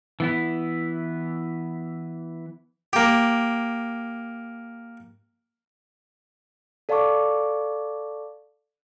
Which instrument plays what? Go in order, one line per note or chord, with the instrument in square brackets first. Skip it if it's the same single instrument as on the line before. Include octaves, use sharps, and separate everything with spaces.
[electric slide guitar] E3 B3 E4
[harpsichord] A#3 G4
[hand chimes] A4 D5 F5 A5 C#6 D6